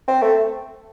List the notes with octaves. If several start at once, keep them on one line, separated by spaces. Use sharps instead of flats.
C4
A3